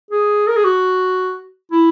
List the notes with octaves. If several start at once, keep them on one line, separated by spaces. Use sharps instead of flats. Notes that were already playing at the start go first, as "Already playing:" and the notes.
G#4
A#4
G#4
F#4
E4